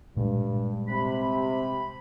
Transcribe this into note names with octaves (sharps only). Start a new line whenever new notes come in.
G2 A#2 G3 G#3
C3 B5